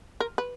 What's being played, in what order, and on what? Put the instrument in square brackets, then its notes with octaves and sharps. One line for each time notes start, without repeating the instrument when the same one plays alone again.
[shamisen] A#4
B4